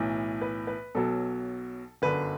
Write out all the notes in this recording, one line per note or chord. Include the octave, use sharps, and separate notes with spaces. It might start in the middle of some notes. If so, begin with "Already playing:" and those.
Already playing: B1 A2 E3
B4
B4
B1 B2 F#3 A4
G1 F#2 D3 B4